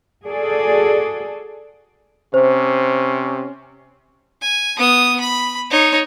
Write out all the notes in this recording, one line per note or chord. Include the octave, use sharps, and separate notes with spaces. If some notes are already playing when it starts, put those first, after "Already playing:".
F#4 G#4 A4 D5
C3 C#4 C5
G#5
B3 D#6
B5
D#4 C#5